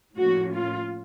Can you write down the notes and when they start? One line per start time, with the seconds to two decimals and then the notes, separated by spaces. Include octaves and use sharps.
0.17 A2 F3 A#3 C#4 F#4
0.53 F4